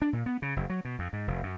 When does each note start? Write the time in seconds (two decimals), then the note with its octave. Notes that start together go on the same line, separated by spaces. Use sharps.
0.02 D4
0.13 A#2
0.26 B3
0.42 C#3
0.56 F#1
0.70 F#3
0.85 B2
0.99 F2
1.13 G#2
1.28 F1
1.43 F#2